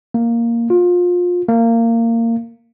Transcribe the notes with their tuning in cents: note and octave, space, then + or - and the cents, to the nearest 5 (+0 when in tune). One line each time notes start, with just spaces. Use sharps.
A#3 +0
F4 +25
A#3 -20